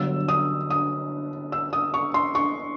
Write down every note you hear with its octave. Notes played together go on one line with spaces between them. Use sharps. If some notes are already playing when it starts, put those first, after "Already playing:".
Already playing: G1 G2 D3 F#3 E6
D#6
D#6
E6
D#6
C#6
C6
C#6